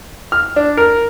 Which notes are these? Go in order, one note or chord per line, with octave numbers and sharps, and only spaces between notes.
F6
D4
A#4